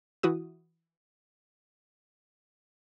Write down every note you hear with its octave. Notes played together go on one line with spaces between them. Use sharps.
E3 E4 F#4 D#6